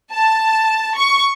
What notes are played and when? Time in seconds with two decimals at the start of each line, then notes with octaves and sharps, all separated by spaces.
0.12 A5
0.98 C#6